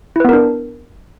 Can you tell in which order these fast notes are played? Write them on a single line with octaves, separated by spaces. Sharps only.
E4 B4 B3 A#4 D4